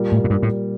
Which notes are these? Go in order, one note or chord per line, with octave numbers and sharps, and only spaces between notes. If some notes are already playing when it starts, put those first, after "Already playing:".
Already playing: A#2 G3 A#3
A2
A2
G2
A2